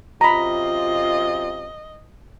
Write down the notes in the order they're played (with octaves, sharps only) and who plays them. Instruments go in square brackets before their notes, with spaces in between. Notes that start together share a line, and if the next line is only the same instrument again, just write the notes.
[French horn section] F#2 C3 F4 [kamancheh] D#5 [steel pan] A#5 B5